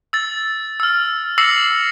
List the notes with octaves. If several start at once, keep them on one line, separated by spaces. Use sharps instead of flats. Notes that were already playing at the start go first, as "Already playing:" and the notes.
E6 A6
E6 F6
D6 E6 A#6 C7 C#7 F#7